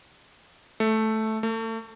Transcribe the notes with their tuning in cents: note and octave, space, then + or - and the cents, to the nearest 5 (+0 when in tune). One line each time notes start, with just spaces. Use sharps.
A3 -5
A3 +35